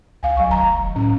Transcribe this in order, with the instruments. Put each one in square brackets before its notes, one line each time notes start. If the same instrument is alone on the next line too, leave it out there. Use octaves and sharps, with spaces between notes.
[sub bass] C#2 [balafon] F5 G#5
[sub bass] C2 [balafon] F#3 C#6
[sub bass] F1 [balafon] D#3 A#5
[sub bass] A2 [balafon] C#4